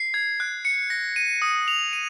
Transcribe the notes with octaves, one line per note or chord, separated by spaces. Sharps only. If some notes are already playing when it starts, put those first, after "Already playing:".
Already playing: C7
G#6
F#6
C#7
A#6
D#7
D#6
F7
D#7